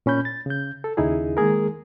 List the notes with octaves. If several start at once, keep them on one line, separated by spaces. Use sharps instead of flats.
A#2 C#4 B5 G6
A6
C#3 G6
A4
D#2 C#3 D#4 E4 G#4
D#3 G#3 A#3 G#4 A#4